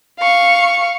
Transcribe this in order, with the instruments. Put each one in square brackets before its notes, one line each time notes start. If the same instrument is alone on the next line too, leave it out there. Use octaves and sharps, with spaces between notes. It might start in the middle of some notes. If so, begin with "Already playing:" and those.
[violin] F5 C#6